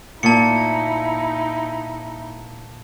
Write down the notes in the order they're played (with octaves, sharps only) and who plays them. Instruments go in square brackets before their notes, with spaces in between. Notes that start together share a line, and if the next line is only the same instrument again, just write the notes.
[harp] A#2 [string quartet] D#4 E4 [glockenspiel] A5 C#7